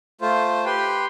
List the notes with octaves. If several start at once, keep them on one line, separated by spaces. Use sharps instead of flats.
A3 F4 C5
G4 B4 G5 C6